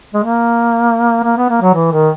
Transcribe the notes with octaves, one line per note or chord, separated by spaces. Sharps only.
G#3
A#3
A#3
B3
A#3
F#3
E3
D#3